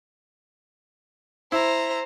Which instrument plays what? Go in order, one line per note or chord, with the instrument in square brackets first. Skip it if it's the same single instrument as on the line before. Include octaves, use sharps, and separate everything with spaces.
[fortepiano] E4 [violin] C5 A#5